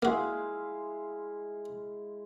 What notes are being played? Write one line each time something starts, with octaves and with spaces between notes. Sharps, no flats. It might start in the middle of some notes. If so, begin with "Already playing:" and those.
G#3 A#3 E4 F#4 F5